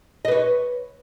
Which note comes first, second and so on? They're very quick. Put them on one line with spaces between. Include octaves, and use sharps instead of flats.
D#5 B4 C#5